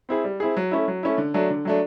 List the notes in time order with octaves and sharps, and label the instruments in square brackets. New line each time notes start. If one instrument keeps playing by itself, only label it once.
[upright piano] C4 E4 G#4
G3
C4 E4 G#4
F#3
A3 C#4 E4
F#3
A3 C#4 E4
D3
F#3 A3 D4
D3
F#3 A3 D4